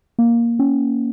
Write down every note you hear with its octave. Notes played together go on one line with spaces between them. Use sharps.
A#3
C#4